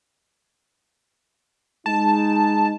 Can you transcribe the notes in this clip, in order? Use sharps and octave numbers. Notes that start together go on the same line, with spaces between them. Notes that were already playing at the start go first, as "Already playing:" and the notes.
G#3 D#4 A5